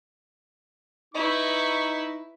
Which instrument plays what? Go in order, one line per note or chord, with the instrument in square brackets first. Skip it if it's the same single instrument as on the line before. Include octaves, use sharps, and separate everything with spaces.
[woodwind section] D#4 [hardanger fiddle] E4 B4 [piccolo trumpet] C#6